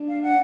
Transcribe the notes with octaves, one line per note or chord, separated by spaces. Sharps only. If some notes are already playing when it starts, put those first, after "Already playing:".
Already playing: D4
F5
F#5